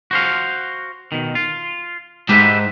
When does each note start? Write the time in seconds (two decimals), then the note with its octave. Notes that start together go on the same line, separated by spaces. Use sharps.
0.11 F#4 C5 F5
1.12 B2 D#3
1.35 F4
2.29 G#2 G4 B4 E5